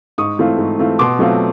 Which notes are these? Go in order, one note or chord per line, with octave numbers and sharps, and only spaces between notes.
G#2 C#6 D#6
E3 A3 C4 F4
G#2
E3 A3 C4 F4
B2 C6 D6
F#3 A3 C4 F4